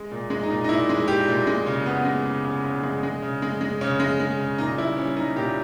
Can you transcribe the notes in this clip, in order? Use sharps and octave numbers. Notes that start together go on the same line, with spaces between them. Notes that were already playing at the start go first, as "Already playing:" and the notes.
Already playing: G#3
A#2
G#3
D#4
A#2
D#4
A#2 E4
G#3
A#2 G4
A#2
G#3
C#3
C#3 B3
G#3
C#3
C#3
C#3
G#3
G#3
C#3
G#3
G#3
C#3 C#4
G#3
G#3
C#3
A#2 D#4
G3 E4
G3 C#4
G3 D#4
A#2 G4